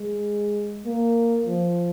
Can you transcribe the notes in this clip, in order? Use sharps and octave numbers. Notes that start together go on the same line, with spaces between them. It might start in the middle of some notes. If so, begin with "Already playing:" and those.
Already playing: G#3
A#3
F3